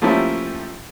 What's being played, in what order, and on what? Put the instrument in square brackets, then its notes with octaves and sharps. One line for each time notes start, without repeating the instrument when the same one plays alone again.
[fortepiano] F3 A3 A#3 C#4 E4 G4